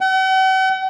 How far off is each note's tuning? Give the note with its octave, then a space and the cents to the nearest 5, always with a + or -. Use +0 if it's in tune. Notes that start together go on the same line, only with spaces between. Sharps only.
F#5 +45